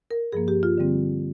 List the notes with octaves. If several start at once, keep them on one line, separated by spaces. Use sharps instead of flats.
A#4
G2 F3 A#3 G#4
G4
F4
D3 G3 C4